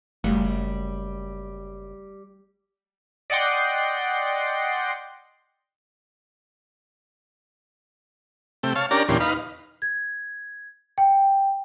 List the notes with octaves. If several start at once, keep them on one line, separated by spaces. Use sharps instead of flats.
F#1 G3 A3
D5 D#5 F#5 G5 C6
C3 A3 G5
C#5 F5 A5
C#4 D4 G4 A#4 D5 A#5
E2 A#2 D3 C#4 G4 C6
D#4 B4 F5
G#6
G5